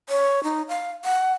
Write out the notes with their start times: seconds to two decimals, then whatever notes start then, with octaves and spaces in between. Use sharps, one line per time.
0.09 C#5
0.44 D#4
0.69 F5
1.05 F#5